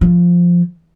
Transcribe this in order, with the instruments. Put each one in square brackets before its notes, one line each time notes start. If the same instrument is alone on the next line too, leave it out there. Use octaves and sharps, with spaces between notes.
[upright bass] F3